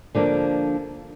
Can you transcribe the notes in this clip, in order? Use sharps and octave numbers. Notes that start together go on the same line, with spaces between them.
D3 F3 A#3 D4